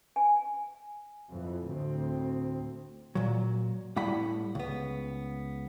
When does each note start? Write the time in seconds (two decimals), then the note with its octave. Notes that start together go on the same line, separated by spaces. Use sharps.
0.16 G#5
1.32 F2 E3
1.65 D2 A2 C4
3.15 A#2 F#3
3.96 A2 G3 E4 F#5 B5
4.55 C#2 B3